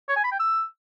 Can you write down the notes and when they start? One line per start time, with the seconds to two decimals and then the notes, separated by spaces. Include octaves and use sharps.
0.09 C#5
0.16 G#5
0.24 B5
0.32 G5
0.39 E6